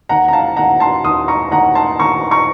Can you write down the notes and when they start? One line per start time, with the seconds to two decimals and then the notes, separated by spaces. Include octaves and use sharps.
0.09 D#2 F#5 A#5
0.28 A#5
0.33 F5 A5
0.57 D#2 F#5 A#5
0.80 A5 C6
1.04 D#2 C6 D#6
1.28 A#5 C#6
1.51 D#2 F#5 A#5
1.75 A5 C6
1.99 D#2 A#5 C#6
2.31 A#5 C#6